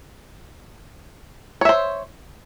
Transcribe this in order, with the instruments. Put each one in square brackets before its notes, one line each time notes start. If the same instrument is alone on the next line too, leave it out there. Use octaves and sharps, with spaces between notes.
[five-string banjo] C#5
E5
C5